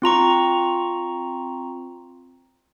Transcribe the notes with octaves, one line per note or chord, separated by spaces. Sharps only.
C4 F4 A#5 C#6